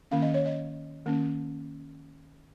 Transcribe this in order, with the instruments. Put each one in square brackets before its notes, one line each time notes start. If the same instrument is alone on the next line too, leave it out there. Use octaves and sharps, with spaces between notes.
[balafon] D#3 A#3 C#4 F5
D#5
C#5
D#5
D#3 A#3 C#4